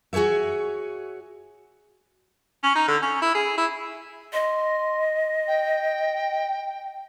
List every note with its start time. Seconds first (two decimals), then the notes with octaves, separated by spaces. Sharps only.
0.13 F#4 G#4 C5 C#5 E5
2.63 C#4
2.75 D#4
2.88 D3
3.02 C#4
3.22 E4
3.35 G#4
3.58 E4
4.33 D#5 C6
5.47 G5